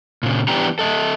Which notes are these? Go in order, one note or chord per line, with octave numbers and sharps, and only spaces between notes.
A#2 C#3
E3 G3 B3 D4 G4 A#5
A4 D#5 E5